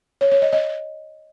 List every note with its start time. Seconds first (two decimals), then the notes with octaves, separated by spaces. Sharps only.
0.21 C#5
0.31 C#5
0.42 D#5
0.53 D#5